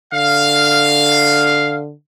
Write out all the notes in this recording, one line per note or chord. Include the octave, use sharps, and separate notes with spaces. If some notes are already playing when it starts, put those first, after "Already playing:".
D3 F5